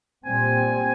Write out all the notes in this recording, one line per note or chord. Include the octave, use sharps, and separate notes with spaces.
A#2 G3 C4 G#5